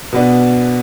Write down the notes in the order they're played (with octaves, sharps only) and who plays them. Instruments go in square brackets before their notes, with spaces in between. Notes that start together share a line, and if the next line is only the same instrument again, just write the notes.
[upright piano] B2 B3 D4